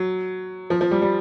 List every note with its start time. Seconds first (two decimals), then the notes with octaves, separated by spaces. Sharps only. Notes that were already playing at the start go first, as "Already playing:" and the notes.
Already playing: F#3
0.70 F3
0.81 F3
0.91 G3
1.02 G3